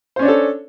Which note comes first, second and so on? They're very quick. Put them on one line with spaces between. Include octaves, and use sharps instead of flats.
C5 C#4 D4 C#5 A4